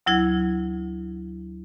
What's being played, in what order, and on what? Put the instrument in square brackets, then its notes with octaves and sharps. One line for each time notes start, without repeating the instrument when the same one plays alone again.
[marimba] D2 F#3 E4 G#6